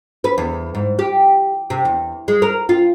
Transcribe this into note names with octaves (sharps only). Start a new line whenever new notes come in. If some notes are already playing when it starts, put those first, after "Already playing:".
B4
E2
G#2
G4
C3
E2
G#3
A#4
F4